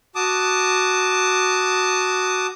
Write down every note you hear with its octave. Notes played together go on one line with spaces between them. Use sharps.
F#4 A5 D6 D#6